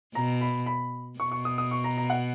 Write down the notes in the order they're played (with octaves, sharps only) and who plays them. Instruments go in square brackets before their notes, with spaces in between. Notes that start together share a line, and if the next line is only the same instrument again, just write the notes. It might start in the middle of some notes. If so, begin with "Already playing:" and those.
[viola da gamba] B2 [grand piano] A#5
[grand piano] B5
B5
[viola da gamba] B2 [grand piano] C#6
[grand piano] C#6
D#6
D#6
C#6
A#5
A#5
F#5